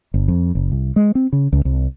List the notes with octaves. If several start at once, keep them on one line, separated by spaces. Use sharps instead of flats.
G1
F2
F#1
C2
G#3
C4
C#3
C#2
C2